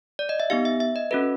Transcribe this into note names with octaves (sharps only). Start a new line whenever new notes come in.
D5
D#5
E5
B3 D#4 G4 F5
E5
E5
D#5
C#4 F#4 A4 B4